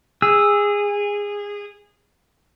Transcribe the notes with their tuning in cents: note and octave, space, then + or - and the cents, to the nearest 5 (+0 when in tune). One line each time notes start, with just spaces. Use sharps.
G#4 -20 E6 +0